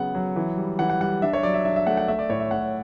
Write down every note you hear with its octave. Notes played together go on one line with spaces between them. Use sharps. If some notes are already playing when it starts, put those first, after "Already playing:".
Already playing: C#3 F#3 B3 F#5
F#3
E3
G3
E3 F#5
F#5
G3 F#5
D4 E5
C#5
F#3 D5
E5
D4 E5
E5
A3 F#5
F#5
A3 E5
D5
A2 C#5
E5
A2 F#5